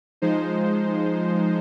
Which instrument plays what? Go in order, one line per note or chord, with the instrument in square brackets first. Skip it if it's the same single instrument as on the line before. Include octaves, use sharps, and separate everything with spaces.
[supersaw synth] F3 G#3 D#4 C5